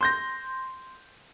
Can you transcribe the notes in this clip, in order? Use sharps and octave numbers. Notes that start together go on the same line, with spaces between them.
C6 G6 A#6